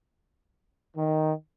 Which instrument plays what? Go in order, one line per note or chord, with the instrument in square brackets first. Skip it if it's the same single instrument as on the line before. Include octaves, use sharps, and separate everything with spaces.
[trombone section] D#3